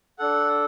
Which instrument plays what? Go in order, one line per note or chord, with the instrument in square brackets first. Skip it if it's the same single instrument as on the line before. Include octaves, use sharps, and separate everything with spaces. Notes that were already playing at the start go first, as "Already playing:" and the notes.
[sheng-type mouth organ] D4 A4 F#5